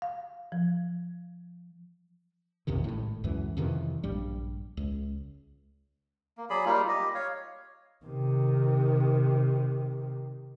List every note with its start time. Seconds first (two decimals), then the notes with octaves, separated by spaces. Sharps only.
0.02 F5
0.52 F3
2.67 A#1 F2 C3 D#3
2.84 G#1 A2
3.24 C#2 F#2 E3
3.57 F2 C3 D#3 E3
4.03 A#1 G2 G3
4.77 C#2
6.37 A#3
6.50 F#3 G#4 D5 B5
6.66 G3 A#3 D#4 F4
6.88 G4 D#5
7.15 C#5 F5
8.05 C3 D#3